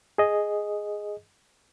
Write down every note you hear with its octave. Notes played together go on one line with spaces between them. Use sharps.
G#4 D#5